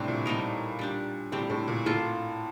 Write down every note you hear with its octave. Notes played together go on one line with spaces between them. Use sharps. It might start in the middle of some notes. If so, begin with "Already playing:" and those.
Already playing: A2 C3 G3 D4
A#2
G3 A#3 D#4 A#4
G3 D4 G4
A2 G3 C4 G4
A2
A#2
A2 A#3 F4 A4